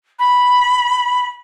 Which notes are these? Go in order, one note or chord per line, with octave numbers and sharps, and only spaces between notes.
B5